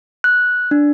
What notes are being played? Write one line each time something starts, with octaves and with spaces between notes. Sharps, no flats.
F#6
D4